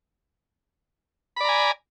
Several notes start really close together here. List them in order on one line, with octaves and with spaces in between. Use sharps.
B5 D5 A#5 G#5